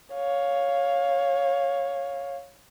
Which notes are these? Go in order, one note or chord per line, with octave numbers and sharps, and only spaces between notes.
C#5 F5